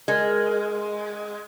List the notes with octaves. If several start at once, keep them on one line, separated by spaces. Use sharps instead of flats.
G#3 A#4
D#5